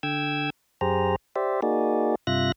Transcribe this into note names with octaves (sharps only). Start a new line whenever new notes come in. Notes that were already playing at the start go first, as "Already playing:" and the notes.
D3 G5 E6 G#6
F#2 G4 G#4 C5 A#5
G4 C5 D5 E5
A#3 D#4 F#4 G#4 D5
G2 C3 F4 E5 F#6 A#6